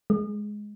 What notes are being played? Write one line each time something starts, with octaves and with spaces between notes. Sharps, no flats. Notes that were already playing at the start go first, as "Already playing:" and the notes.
G#3